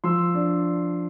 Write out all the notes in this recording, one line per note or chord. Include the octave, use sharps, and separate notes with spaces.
F3 C6 E6
D4